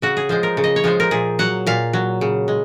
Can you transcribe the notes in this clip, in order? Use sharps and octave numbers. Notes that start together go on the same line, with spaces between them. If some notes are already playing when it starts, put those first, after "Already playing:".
C#3 F#4
G#4
F3 G#3 C5
A#4
C#3
D#5
C#5
F3 G#3 C5
A#4
A#2 G#4
F#3 F#5
A#2 F5
F#3
C#3
G#3